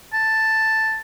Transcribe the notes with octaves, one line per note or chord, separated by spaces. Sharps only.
A5